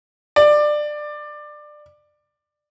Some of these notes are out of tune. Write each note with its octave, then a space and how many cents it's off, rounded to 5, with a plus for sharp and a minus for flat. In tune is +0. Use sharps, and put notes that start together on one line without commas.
D5 +20